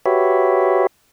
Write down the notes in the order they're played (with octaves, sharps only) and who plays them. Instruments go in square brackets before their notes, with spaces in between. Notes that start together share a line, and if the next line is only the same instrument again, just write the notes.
[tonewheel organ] F#4 G4 B4 C#5 E5